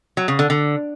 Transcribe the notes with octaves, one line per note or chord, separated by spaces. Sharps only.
F#3
C#3
D3
D3